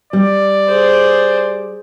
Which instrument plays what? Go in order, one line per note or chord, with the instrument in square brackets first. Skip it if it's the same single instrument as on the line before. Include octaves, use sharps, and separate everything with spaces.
[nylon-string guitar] G3 [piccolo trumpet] D5
[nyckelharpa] G#4 C5